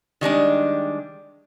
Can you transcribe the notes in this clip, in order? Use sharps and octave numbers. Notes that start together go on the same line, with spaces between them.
D#3 G3 G#3 D4